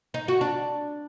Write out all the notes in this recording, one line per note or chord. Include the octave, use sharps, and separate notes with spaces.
D#4
F#4
D4